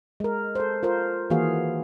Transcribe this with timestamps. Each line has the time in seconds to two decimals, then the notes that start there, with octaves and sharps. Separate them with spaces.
0.20 G#3 A#4
0.55 A4 C5
0.83 F4 A#4 C5
1.30 D#3 E3 A#3 F#4 G#4 F5